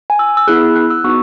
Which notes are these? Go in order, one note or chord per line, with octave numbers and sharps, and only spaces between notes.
G#5
E6
E6
B3 E4 G#4 F#6
E6
F#6
E6
B3 D#4 F#4 C#6